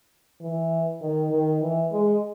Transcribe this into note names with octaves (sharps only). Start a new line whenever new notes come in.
E3
D#3
D#3
E3
G#3